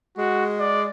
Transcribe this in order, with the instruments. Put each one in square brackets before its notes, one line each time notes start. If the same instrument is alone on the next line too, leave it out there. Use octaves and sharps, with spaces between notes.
[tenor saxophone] G#3 [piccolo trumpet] F#4
[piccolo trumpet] D5